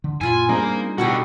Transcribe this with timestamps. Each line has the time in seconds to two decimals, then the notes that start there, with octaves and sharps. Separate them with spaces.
0.04 D3
0.21 F#2 A#2 E4 F4 G#5 B5
0.49 G3 A#3 C4 D4 D#4 G#4 C5
0.98 B2 B3 E4 F#4 G4 A4